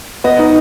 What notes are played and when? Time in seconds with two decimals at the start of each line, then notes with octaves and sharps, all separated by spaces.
0.24 B3 D#5
0.39 D#4